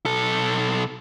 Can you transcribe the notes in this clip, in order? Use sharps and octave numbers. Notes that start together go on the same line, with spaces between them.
B1 A4